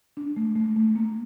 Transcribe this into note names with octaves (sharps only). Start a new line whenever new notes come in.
D4
A3
A3
A3
A#3